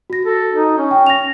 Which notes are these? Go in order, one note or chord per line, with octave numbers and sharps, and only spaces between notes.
F#4 A#6
A4
D#4
C#4
G5
A#6 F7